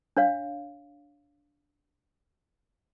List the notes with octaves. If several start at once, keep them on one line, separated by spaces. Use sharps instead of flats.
D4 C#5 F5